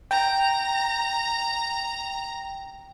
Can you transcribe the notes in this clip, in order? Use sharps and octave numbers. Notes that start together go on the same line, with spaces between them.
G5 A#5